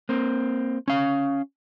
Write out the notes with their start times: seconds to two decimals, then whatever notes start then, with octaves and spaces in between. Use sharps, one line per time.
0.09 A#3 C4
0.88 C#4 F5